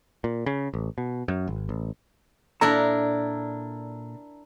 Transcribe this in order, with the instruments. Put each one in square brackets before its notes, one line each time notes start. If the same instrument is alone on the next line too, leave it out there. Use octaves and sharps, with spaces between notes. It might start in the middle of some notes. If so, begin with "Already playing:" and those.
[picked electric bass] A#2
C#3
A1
B2
F#2
G#1
A1
[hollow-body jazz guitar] A#2 A4 A#5 [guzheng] D4 E4 A#4